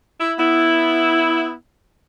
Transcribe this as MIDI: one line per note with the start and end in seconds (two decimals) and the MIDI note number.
0.20 0.33 64
0.39 1.52 59
0.39 1.52 64